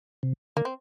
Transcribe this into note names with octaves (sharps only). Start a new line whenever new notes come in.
C3
D3 A#3
C4